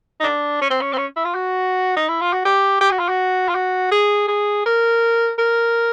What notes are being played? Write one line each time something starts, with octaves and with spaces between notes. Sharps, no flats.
D#4
D4
C#4
C4
C#4
C4
C#4
E4
F4
F#4
D#4
E4
F4
F#4
G4
G4
F#4
F4
F#4
F4
F#4
G#4
G#4
A#4
A#4